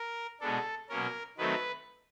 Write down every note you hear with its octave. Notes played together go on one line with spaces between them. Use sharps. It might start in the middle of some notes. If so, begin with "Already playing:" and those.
Already playing: A#4
B2 G#3 B3 D4 A4
B2 F#3 A#3 C#4 A#4
D#3 F#3 A3 C4 B4